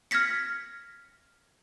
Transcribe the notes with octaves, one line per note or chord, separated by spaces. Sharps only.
F6 G#6 A#6 B6 C#7